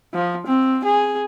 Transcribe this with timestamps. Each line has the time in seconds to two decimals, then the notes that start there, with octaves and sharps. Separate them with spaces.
0.14 F3
0.46 C4
0.84 G#4